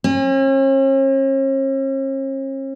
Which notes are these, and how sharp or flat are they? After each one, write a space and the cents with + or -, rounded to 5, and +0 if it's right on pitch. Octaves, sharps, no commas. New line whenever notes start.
C#4 -45